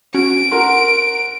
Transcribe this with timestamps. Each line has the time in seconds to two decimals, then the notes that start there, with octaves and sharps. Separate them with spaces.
0.14 C#4 F#4 D7
0.51 A#4 F#5 C6